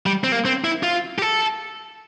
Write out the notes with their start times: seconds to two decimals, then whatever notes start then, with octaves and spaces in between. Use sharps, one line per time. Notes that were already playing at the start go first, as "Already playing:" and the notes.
0.06 G3
0.24 C4
0.32 A#3
0.45 C4
0.64 E4
0.83 F4
1.19 G4
1.22 A4